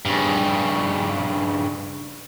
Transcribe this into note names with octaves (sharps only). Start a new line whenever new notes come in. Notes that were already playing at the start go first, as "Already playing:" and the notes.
G2 C#3